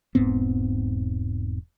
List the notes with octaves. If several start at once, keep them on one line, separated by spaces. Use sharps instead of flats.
E1 G#2 B3 C4